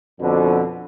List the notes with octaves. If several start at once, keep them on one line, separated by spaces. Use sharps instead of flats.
F2 B2 D3